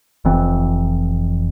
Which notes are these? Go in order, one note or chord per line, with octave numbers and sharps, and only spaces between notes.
F1 F2 E3 C4